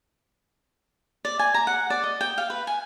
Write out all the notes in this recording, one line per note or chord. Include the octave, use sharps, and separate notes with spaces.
D5
G#5
A#5
F#5
D5
D#5
G5
F5
B4
G#5